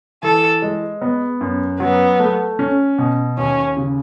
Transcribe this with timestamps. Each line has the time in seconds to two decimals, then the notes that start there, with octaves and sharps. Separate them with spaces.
0.23 E3 A4
0.62 G#3
1.02 B3
1.41 F#2
1.80 F#3 B3
2.20 A3
2.59 C#4
2.98 B2
3.37 D#2 C#4
3.77 C#3